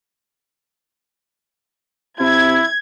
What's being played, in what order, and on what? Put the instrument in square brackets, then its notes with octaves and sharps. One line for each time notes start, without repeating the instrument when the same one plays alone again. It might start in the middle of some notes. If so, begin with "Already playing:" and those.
[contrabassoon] C3 [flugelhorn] E4 [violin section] G#6